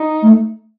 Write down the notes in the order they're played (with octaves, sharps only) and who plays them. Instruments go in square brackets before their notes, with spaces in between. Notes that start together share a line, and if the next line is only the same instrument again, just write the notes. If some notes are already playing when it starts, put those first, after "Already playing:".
Already playing: [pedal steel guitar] D#4
[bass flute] A3